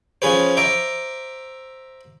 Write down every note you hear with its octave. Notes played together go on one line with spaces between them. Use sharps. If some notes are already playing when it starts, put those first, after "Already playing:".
F3 C#4 G#4 B4 C5
C5 E5 A#5 D6